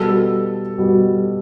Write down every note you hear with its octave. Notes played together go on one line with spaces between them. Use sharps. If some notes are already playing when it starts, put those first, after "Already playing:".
Already playing: B2 G3 A4
B2 G3